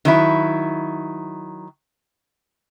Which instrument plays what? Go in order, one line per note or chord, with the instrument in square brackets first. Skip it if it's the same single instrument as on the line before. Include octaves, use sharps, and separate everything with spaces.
[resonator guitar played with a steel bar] D#3 F#3 E4